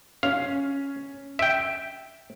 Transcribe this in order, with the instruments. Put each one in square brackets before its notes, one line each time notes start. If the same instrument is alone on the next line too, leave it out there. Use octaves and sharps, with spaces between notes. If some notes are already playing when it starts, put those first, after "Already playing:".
[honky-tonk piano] C#4 [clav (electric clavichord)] F5
[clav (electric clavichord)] E5 G5 [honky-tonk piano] D7